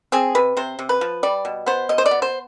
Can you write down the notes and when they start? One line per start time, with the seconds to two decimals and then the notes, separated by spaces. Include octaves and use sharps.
0.12 C4 G#4
0.35 C3 B4
0.57 C3 C5
0.79 C3
0.89 B4
1.01 F3
1.23 G3 D5
1.45 B2
1.66 B3 C5
1.89 B2 D#5
1.98 C5
2.06 D5
2.11 B3
2.22 C5